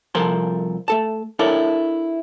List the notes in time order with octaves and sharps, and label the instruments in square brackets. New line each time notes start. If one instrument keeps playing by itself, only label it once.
[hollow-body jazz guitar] C2 F3 A4 A#4 C5 C6
A3 A4 A5
D4 E4 A4 A#4 C#5